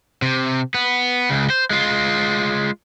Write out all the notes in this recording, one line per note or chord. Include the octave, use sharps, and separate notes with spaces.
C3
B3
C#2 C#3
C5
G#3 F4